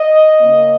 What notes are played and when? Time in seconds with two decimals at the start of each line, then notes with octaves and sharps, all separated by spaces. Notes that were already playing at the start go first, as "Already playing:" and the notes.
Already playing: D#5
0.42 C#3 A#3 C#4